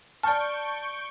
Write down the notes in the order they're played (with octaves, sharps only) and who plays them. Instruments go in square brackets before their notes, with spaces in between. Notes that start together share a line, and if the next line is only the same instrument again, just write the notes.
[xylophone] D5 F6 [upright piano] A5 [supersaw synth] C#6 G6 D7